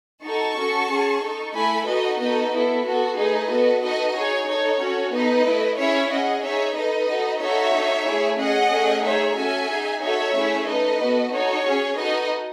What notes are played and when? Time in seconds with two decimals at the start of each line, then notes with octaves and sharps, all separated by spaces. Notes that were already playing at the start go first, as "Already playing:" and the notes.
0.23 D#4 F#4 A4 A5 C#6
0.56 C#4 F#4 A4
0.89 C#4 G#4
1.22 D#4 A4
1.54 A3 E4 A4 G#5 B5
1.86 D#4 F#4 A4 B4 D#5
2.19 B3 D#4 F#4 A4 B4 D#5
2.51 B3 E4 A4
2.84 B3 F#4 A4
3.17 A3 D#4 G#4 B4 D#5
3.49 B3 F#4 A4
3.81 D#4 F#4 A4 B4 D#5
4.15 D#4 G#4 C#5
4.47 D#4 A4 C#5
4.80 C#4 F#4 A4
5.12 B3 D#4 A4 B4 D#5
5.45 A3 E4 A4
5.77 C#4 E4 G#4 C#5 E5
6.10 C#4 G#4 D#5 F#5
6.43 D#4 G#4 C#5 E5
6.75 D#4 A4 B4 D#5
7.08 D#4 F#4 A4
7.40 D#4 F#4 A4 C#5 E5
7.73 D#4 A4
8.05 A3 E4 G#4
8.38 C#4 G#4 D#5 F#5
8.71 A3 C#4 G#4
9.03 D#4 G#4 C#5 E5
9.36 C#4 F#4 A4 E5 G#5
9.68 D#4 G#4
10.01 D#4 F#4 A4 C#5 E5
10.34 A3 C#4 E4 G#4
10.66 D#4 A4 B4 D#5
10.99 B3 F#4 A4
11.32 D#4 F#4 A4 C#5
11.64 C#4 G#4
11.97 D#4 F#4 A4 B4 D#5